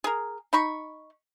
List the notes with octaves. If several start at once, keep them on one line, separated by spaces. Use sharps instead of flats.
G#4 A#4
D#4 B5 C#6